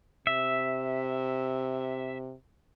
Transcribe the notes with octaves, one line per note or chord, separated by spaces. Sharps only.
C3 E5